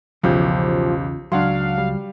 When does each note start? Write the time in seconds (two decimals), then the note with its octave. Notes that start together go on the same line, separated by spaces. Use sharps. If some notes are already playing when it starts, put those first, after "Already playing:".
0.23 B1 E2 C#3 F3 C#4 G4 G6
1.32 C#2 F#3 D4 F5 F#5 C6
1.78 G3